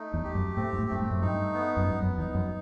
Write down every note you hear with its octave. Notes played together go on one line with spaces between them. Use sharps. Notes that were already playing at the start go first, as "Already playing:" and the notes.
Already playing: A3 D#4
E2
G4
F#2
A2 C4
G2
A2
G2 A3
A2
F#2
G2 D#4
B3
F#2
G2 B3
F#2
E2 D#4
F#2